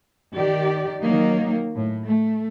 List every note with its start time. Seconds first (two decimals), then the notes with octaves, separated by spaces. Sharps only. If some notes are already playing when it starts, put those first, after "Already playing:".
0.35 D#3 G4 D5
1.02 D#3 F#3 A#3 D#4
1.75 A2
2.04 A3